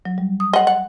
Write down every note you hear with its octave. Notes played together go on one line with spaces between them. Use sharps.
F#3
G3
D#6
D#5 F#5
F#5